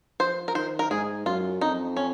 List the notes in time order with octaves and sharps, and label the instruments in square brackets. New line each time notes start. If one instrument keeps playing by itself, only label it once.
[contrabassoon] F3 [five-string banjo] C5
[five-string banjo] A#4
[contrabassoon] D#3 [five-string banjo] C5
[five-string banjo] A#4
[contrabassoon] G#2 [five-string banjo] G#4
[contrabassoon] F#2 [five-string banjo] F4
[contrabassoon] F2 [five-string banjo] D#4
[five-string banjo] C#4